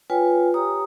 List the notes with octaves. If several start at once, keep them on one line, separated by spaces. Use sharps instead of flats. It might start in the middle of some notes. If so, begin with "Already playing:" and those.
F4 B4 C#5 G5 G#5
G4 C#5 A#5 D#6